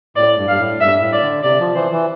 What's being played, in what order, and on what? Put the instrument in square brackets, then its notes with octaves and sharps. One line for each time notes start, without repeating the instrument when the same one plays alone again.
[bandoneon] A2 [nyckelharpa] D5
[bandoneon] G2
[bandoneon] G2 [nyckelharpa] F5
[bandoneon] A2
[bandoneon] G2 [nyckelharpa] E5
[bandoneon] A2
[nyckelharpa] D5
[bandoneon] D3
[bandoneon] C3 [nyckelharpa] D5
[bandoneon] F3
[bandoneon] E3 [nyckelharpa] C5
[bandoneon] E3